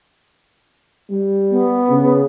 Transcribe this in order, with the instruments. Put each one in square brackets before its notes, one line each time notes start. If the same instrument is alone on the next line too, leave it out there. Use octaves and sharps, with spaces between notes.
[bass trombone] G3
[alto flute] B3
[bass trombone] C#3